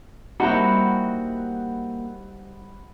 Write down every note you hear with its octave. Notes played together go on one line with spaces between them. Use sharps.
G3 A#3 C4 D#4 E4 F#4 F#5 B5